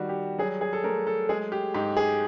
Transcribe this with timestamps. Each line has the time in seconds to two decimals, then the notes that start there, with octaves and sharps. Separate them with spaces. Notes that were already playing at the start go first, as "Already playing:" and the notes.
Already playing: D#3 G3 F#4
0.09 G4
0.38 F#3 G#4
0.61 G#4
0.73 A4
0.84 A3 A#4
1.07 A4
1.29 G#3 G#4
1.52 G4
1.74 G#2 G4
1.97 G#4